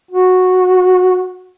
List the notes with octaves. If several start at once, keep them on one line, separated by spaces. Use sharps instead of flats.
F#4